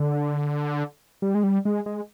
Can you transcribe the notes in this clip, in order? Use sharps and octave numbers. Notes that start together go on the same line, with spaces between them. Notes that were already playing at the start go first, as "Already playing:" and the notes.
Already playing: D3
G3
G#3
G3
G#3
G#3